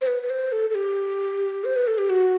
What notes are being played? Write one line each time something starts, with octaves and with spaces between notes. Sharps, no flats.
C5
B4
B4
C5
A4
A4
G4
C5
B4
A4
G4
F#4